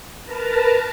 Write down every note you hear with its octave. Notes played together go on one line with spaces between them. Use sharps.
A#4 B4 A5 A#5